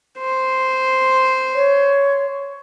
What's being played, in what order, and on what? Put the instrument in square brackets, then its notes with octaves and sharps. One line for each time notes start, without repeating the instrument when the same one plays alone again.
[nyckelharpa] C5
[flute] C#5